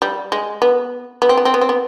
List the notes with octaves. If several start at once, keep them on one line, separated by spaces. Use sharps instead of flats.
G3
G#3
B3
B3
C4
B3
C4
B3
C4
B3